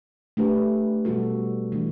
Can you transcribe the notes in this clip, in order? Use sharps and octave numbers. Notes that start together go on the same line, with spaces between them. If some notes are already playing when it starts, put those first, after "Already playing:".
A3 D4 G4 B4
B2 G3 B3 F#4 A4
E3 A3 D4